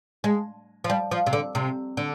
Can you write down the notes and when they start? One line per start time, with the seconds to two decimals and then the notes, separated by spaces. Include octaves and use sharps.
0.24 G#3
0.84 F3
0.90 G3
1.11 F3
1.26 C3
1.33 D3
1.55 C3
1.97 D3